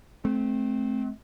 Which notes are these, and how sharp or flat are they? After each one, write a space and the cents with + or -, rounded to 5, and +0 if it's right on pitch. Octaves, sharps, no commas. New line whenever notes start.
A3 -30 C4 -5